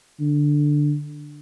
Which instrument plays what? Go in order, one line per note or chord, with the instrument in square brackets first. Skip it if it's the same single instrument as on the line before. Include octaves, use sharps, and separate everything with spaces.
[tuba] D3